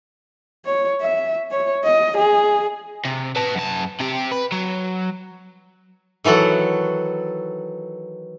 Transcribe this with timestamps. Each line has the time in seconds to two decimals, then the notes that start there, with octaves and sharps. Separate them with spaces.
0.65 C#5
1.01 E5
1.51 C#5
1.84 D#5
2.17 G#4
3.05 C3
3.36 B4 A5
3.55 F#2 A5
4.00 C3 G4
4.32 B4
4.52 F#3
6.24 D#3 E3 F#3 A4 F#5